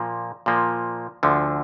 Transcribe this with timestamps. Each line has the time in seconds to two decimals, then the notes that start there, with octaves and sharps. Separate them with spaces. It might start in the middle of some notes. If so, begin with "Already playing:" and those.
Already playing: A#2 F3 A#3
0.46 A#2 F3 A#3
1.23 D2 D3 F3